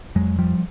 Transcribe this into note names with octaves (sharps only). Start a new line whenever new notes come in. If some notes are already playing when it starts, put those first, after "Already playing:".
F2 F#3 G#3
F3 G3